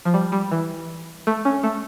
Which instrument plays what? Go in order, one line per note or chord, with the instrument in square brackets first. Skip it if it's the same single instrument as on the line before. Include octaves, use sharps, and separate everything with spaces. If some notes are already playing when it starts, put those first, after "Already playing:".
[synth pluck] F3
G3
G3
E3
A3
C#4
A3